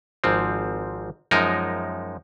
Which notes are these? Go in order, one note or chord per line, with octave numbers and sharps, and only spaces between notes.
G#1 G#2 F3 C4
F#2 F3 G#3 D#4 A#4